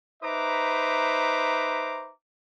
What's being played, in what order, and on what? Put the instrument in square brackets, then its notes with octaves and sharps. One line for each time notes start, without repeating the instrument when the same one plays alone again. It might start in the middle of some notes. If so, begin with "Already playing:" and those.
[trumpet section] D#4 B4 C5 E5 A#5 D6